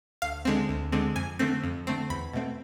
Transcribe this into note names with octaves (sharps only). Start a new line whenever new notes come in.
D2 F5
D3 G#3 C4
D2
D3 G#3 C4
F2 G#5
D3 A3 C4
F2
D3 A3 C4
E2 B5
B2 A3 C4